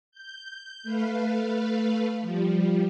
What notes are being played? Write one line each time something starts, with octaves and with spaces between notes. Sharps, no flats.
G6
A3 B4 F5
F3 G3